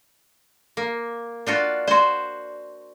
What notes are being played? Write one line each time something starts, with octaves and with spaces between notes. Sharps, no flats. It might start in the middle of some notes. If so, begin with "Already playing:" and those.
A#3
D4 F4 F#4
F#4 C5 D5 C6